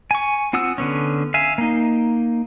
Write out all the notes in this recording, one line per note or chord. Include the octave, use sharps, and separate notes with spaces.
G#5 C#6
C4 F4 F#5 D#6 E6
D3 B3 C#4
E5 F5 G#5
A#3 D#4